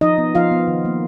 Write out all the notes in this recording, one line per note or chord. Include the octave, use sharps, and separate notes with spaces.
F3 D#4 D#5
B3
F3 F4 F5
B3
D#3
A#3